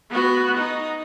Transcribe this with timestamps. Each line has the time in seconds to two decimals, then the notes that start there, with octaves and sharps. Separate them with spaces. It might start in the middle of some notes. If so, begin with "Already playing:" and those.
0.10 B3 F#4
0.58 D#4